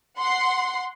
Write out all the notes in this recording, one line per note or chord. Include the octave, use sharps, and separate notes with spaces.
F#5 C6